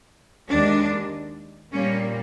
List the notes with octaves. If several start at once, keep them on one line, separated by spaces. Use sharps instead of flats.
D#2 D#3 G#3 D4
A#2 G3 A#3 C#4